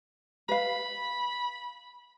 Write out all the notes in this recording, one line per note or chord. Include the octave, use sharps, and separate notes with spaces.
B4 F5 B5